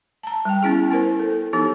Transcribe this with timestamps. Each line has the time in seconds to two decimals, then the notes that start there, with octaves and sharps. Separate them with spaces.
0.23 A5 A#5
0.45 G3 G5
0.63 B3 C#4 E4 G#4
0.91 B3 E4 A#4 C5
1.20 A4
1.53 F3 B3 D#4 G4